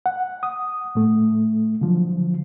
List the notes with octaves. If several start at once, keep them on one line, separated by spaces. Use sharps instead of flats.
F#5
D#6
A2 A3
D3 F3 F#3